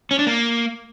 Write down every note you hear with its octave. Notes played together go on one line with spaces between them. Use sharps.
C#4
D4
A#3